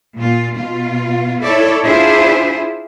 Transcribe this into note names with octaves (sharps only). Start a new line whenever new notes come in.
A#2 F4
B2 F4
E4 A4 C#5 D5
D4 E4 F4 G#4 C5 E5